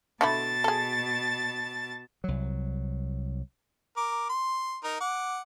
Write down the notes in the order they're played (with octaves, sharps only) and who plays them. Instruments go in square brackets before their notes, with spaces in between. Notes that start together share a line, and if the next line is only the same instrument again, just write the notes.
[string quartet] B2 A5 A6 [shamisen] D3 A3 E4
[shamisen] G#4 A4
[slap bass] C2 F#3
[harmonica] A#4 D6
C6
D#4 A#4
F#5 D6